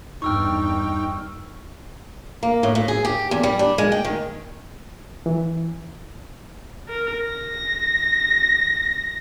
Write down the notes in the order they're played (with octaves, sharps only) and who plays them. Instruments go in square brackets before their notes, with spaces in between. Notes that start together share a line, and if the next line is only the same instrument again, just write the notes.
[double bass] E2 G2 [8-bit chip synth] D#4 G5 [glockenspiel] C#6 E6 F6
[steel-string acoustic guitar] A#3
A2
A2
G#4
G4
E2
G3
D4
G#3
G5
D#3
[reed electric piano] E3
[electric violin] A#4
A#6